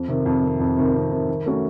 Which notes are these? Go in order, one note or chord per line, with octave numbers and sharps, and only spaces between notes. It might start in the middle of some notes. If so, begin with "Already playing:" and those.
Already playing: F2
C3 D#3
F2
C3 D#3
F2
C3 D#3
F2
C3 D#3
D#3
A3 C#4 F#4 A#4